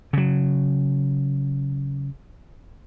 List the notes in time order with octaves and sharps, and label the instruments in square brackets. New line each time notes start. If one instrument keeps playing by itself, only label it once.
[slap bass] C#3 F#3